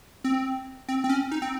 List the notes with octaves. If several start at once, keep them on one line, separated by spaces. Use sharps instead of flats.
C4
C4
C4
C#4
D#4
C4